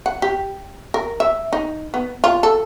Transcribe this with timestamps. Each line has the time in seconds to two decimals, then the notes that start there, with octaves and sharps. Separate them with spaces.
0.06 F#5
0.22 G4
0.94 A#4
1.20 E5
1.53 D#4
1.94 B3
2.24 F4
2.43 A4